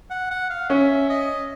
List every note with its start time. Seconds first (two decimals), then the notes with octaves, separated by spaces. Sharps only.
0.10 F#5
0.31 F#5
0.50 F5
0.69 C#4 E5
1.09 D#5